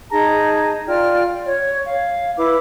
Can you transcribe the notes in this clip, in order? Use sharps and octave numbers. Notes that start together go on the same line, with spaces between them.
D#4 G#4 A5 A#5
F4 D5 G5 F6
C#5
F5
E4 B4 D6